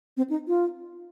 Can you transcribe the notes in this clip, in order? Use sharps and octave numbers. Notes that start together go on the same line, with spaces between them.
C4
D#4
F4